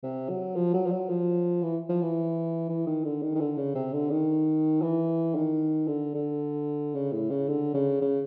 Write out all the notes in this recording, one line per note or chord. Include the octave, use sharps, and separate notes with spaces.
C3
F#3
F3
F#3
F3
F#3
F3
E3
F3
E3
E3
D#3
D3
D#3
D#3
D3
C#3
C3
D3
D#3
E3
D#3
D3
D3
C#3
A2
C#3
D3
C#3
C#3